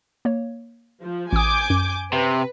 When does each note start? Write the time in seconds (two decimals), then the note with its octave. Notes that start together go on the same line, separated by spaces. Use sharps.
0.25 A#3 C#5
1.02 F3
1.33 A1 G#5 D6 D#6 G6
1.70 F#2
2.13 C3 B4